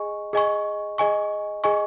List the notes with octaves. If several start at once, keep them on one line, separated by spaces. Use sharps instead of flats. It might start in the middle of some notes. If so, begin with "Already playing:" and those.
Already playing: G#4 D#5 G#5 C#6
G#4 D#5 G#5 C#6
G#4 D#5 G#5 C#6
G#4 D#5 G#5 C#6